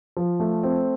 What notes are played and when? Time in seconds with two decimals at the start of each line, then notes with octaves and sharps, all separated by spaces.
0.17 F3
0.40 A3
0.63 C4